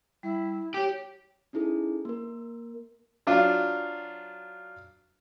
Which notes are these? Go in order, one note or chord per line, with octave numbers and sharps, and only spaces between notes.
G3 E4
G4 C#5 D6
C#4 D#4 E4 G#4 A4
A#3 A#4
F#3 D4 F4